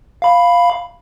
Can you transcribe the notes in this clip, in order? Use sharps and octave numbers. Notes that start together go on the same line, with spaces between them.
F5 B5